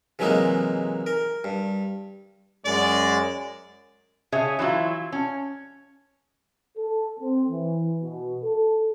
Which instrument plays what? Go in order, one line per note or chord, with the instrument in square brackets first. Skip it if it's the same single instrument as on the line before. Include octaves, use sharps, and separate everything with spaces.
[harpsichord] C3 E3 F#3 G#3 A#3 D#4
A#4
G2
[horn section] F#2 G#3 D5
[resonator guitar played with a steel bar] C#3 G#4 C#5 E5
E3 F#3 E4 F4
C#4
[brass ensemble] A4
C4
E3
B2
A4